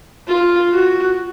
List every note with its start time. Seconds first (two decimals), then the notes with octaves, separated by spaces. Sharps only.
0.27 F4
0.72 F#4